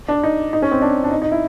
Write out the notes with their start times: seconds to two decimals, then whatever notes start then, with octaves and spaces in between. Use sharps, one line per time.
0.08 D4
0.23 D#4
0.53 D#4
0.62 C#4
0.71 C4
0.82 D4
1.04 D4
1.11 D#4
1.22 D#4
1.32 E4